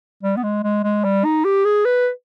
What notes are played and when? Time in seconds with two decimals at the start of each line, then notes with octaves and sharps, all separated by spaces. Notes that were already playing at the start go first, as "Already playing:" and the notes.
0.23 G3
0.37 B3
0.43 G#3
0.64 G#3
0.84 G#3
1.04 G3
1.25 D#4
1.45 G4
1.65 G#4
1.85 B4